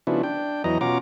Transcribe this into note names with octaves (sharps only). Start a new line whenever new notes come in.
C#3 F3 B3 D4 E4 F#4
D4 G5
E2 E3 F#3 D#5 A#5
B2 C#4 F4 F#4 A#5 D6